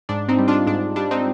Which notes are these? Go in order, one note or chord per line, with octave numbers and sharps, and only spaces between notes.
G#2 D4
C4 D#4
G3
D4 F4
G#2 D4
G3 D4
C4 D#4